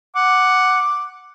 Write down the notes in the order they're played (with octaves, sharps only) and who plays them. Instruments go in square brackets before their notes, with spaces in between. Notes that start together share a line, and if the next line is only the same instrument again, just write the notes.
[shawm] F#5 [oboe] D6